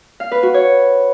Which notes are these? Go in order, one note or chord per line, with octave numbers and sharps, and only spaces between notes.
F5
B4
F#4
C#5